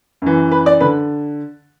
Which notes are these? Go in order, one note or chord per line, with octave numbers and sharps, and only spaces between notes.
F#2 E3
B4
D5
D3 B4